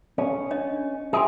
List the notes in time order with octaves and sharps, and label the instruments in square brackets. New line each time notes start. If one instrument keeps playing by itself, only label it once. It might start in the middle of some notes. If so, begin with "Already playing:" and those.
[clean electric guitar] C#4 [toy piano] A4
[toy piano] D4 C#5 D#5
[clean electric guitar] G4 G#4 [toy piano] E5 G#5 C6